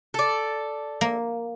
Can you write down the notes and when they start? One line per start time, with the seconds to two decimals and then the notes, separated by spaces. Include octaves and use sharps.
0.14 A4 D5
1.01 A#3